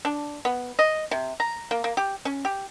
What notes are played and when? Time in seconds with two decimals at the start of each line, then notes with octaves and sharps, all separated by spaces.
0.05 D4
0.45 B3
0.79 D#5
1.11 C3
1.40 A#5
1.71 A#3
1.84 A#3
1.97 G4
2.25 C#4
2.45 G4